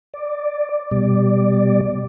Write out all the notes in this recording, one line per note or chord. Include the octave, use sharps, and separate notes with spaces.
D5
B2 G3 D5